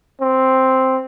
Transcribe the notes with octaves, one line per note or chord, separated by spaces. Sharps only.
C4